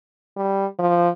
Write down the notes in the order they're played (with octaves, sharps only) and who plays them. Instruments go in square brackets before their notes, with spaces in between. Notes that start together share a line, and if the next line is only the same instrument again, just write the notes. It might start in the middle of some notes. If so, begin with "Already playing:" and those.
[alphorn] G3
F3